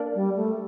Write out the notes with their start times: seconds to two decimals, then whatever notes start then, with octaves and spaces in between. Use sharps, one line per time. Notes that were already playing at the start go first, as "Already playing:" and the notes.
Already playing: A#3 D4
0.15 G3
0.36 A3